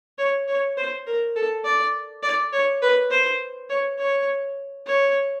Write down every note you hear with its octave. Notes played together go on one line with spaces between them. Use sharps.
C#5
C#5
C5
A#4
A4
D5
D5
C#5
B4
C5
C#5
C#5
C#5